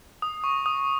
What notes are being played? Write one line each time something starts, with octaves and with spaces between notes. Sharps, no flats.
D#6
C#6
D#6